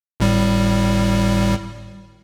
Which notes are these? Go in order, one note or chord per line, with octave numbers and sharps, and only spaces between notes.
G#1 A2 G3